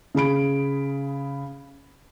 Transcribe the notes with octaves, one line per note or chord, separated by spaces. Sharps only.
C#3 G#4 B5 D7